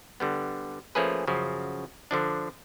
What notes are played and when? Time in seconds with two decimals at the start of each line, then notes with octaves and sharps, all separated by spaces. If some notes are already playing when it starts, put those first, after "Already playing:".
0.20 D3 G3 B3
0.95 F3 A3 A#3 C#4 G#4 B4
1.27 F#2 C#3 F3
2.11 D3 F3 D4